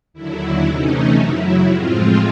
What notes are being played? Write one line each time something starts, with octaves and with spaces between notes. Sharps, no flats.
D#2 D3 F#3 E4
C3 E3 A3 C#4 D#4
F#2 C#3 F#3 E4
A2 F3 G#3 C4 F4